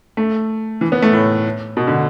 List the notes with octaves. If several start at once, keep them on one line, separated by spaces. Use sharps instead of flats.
A3
E3
B3
A3
A2
B2
D3